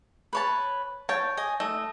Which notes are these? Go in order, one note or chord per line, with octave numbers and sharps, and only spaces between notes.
B4 C#5 A5
C#5 G5 A5
D#5 G#5
A3 D#5